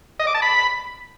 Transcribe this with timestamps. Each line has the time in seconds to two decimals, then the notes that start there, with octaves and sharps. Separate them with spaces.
0.19 D#5
0.27 D6
0.35 A5
0.42 B5